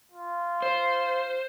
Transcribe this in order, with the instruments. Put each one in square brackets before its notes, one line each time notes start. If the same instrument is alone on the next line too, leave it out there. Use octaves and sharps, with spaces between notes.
[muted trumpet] F4
[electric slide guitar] C5